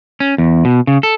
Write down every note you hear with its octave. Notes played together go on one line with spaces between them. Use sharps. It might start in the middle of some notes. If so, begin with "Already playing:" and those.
C#4
E2
B2
C#3
A4